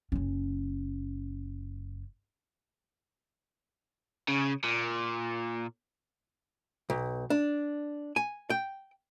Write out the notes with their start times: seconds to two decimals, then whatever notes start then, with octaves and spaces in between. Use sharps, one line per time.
0.12 F#1 C#4
4.28 C#3
4.64 A#2
6.90 B1
7.30 D4
8.16 G#5
8.50 G5